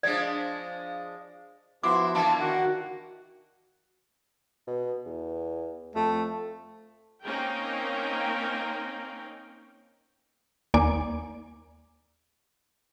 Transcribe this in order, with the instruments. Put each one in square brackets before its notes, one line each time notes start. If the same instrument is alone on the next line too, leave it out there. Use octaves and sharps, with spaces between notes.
[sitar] F3 G#3 D4 [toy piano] D5
[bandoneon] F3 B3 F#4 [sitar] E4 [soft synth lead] C6 [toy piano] D6
[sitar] E3 A#3 D4 [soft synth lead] A5
[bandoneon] D#3 F#5 [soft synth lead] F#4
[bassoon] B2
E2
[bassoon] F2 [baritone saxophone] A3
[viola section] A#3 C4 C#4 D#4 A#4 G5
[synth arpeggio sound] D#2 A#3 D5 G#5 D6